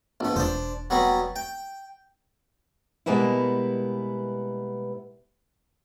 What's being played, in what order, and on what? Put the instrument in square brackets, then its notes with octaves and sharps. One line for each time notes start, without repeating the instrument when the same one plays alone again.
[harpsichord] A#1 B3
[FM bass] E1 [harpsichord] D4 C5
[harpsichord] F#3 G3 B3
G5
[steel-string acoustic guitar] B2 G3 G#3 A#3 B3 E4